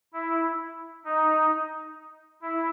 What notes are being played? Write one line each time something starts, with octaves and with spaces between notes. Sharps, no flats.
E4
D#4
E4